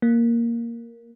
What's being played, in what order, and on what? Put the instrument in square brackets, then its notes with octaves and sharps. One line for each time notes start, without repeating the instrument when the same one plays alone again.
[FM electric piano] A#3